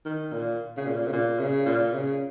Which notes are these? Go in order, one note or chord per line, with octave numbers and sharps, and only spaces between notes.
D#3
A#2
C#3
A#2
C#3
A#2
C#3
A#2
C#3